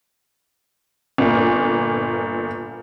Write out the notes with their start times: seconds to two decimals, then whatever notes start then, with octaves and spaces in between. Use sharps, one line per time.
1.18 G1 A#2